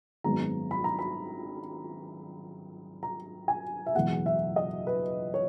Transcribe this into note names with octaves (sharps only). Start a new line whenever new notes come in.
G#1 F#2 D#3 G#3 B3 A#5
B5
A#5
B5
A#5
G#5
E5
F#1 E2 B2 G#3 B3 F#5
E5
D#5
B4
C#5